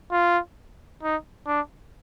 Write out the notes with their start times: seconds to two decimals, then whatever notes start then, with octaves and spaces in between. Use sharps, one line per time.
0.12 F4
1.03 D#4
1.47 D4